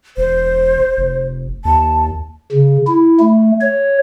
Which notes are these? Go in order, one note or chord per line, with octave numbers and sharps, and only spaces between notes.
E1 C5
F1
D#2 A5
C#3
E4
A3
C#5